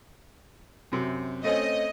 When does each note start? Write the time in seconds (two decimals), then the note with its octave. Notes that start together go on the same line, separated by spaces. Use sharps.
0.92 F#2 C3
1.44 A3 C4 C#4 D#5